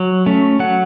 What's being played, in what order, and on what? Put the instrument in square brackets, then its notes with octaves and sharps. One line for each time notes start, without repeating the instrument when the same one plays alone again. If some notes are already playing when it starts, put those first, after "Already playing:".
Already playing: [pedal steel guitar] F#3
A3 C#4
F#3 F#5